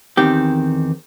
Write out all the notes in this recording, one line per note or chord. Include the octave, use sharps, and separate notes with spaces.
E2 D#3 C4 G4